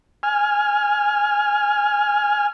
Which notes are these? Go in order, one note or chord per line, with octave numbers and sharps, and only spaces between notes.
G#5 F6